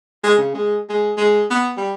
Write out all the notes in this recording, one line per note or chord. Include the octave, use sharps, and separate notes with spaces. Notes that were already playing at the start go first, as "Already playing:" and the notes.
G#3
C#3
G#3
G#3
G#3
B3
G3